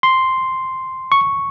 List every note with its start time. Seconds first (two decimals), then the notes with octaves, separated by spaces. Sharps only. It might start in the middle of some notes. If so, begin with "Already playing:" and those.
0.03 C6
1.12 C#6